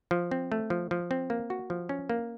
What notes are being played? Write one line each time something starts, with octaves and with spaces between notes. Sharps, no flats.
F3
C4
A3
F3
F3
C4
A#3
F#4
F3
C#4
A#3